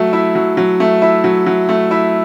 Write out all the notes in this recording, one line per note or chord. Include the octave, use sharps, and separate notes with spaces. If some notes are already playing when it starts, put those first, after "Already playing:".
Already playing: F#3 A3
E4
F#3
F#3
A3
E4
F#3
F#3
A3
E4